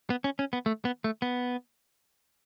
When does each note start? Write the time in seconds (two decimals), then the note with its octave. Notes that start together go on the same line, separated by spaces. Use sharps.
0.10 B3
0.24 C#4
0.39 C#4
0.53 B3
0.66 A3
0.85 B3
1.04 A3
1.22 B3